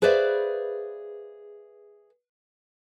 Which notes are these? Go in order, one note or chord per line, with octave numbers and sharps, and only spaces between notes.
G#4 B4 C5 D5 E5 F5